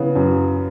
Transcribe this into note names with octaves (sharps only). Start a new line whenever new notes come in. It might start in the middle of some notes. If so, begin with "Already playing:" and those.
Already playing: C#3 E3 B3
F#2